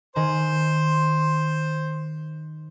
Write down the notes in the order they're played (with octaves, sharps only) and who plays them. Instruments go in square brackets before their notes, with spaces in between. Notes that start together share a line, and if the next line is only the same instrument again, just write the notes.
[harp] D#3 G#4 [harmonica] C5 C6